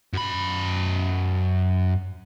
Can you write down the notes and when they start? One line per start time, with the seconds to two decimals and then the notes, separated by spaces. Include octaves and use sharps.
0.14 F#2 B5